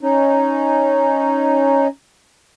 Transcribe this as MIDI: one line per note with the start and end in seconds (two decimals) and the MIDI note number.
0.01 1.88 61
0.01 1.88 63